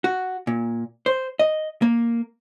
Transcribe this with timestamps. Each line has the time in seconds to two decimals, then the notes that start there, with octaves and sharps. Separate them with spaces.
0.04 F#4
0.47 A#2
1.06 C5
1.39 D#5
1.82 A#3